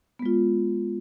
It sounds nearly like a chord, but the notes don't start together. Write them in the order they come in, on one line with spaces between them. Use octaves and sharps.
B3 G#3 F4